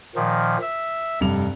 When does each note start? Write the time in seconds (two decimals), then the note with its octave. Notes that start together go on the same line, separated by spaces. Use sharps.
0.15 A#2 D#3 F3
0.61 E5
1.20 F1 G2 F7